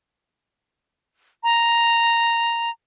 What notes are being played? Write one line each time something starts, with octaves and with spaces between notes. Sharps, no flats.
A#5